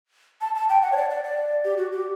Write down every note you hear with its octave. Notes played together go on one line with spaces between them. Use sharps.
A5
A5
G5
F#5
C#5
D5
D5
D5
G4
F#4
G4